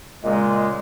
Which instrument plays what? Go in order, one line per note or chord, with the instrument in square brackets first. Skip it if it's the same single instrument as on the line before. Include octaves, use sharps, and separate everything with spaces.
[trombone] A#2 [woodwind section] C#3 G#3 [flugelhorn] D#5